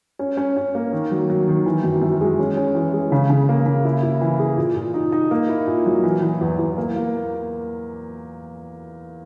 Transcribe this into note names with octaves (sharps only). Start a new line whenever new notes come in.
C#4
C#4
C#4
A#3
D#3
F#3
F#3
D#3
E3
F#2
F#2
G#3
C#4
C#4
E3
G#3
C#3
C#3
A#3
C#3
E4
E4
E3
G#4
A#2
A#2
D#4
D#4
A#3
E4
A#2
F#3
E3
E3
E2
E2
A#3
A#3